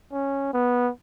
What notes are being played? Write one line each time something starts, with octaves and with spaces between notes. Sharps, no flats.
C#4
B3